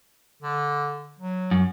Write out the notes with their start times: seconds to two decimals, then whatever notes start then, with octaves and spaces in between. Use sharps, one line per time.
0.43 D3
1.19 F#3
1.51 F#2